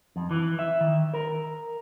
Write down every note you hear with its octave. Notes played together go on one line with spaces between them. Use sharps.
F2
E3
E5
D#3
A#4